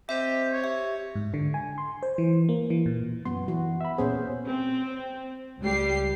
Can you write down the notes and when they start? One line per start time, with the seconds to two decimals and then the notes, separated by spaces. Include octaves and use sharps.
0.09 C4 G4 C5 D#5 E5
0.52 C#5
0.64 G4 E5
1.15 G#2
1.34 D3
1.54 G#5
1.78 C6
2.03 C5
2.18 E3
2.49 A#3
2.70 E3
2.86 A#2
3.25 F#2 B3 C6
3.48 E3 F#4
3.81 E5 B5
3.98 A#2 B3 C#4 G#4 C5
4.46 C4
5.61 C#2 G3 G4 C7